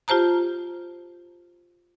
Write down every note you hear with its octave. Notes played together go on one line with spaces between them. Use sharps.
F4 G4 C5 A5 A#5